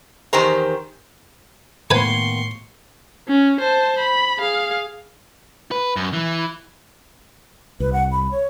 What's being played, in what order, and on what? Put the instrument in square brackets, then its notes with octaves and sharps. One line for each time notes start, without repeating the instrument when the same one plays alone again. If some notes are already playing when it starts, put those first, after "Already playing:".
[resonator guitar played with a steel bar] E2 D#3 G4 C5 A#5
[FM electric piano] A2 [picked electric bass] D#3 A#3 B3 [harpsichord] B4 G#5 [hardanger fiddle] C6 C#6
[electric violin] C#4
C5 A5
B5
G#4 F5
[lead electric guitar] B4
F#2
E3
[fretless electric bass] C2 [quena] B4
[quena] F#5
B5
C#5